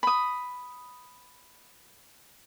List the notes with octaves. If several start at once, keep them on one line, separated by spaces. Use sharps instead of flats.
B5 D#6